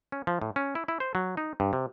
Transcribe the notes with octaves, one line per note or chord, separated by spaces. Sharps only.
C#4
F3
A2
C#4
E4
E4
C5
F#3
D#4
G2
C3